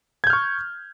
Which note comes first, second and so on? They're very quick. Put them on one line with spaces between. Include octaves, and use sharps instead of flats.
G#6 G6 F6 C#6